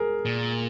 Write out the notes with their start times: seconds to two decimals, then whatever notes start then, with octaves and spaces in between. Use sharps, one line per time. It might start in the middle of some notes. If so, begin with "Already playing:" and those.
Already playing: G#4 A#4
0.25 A#2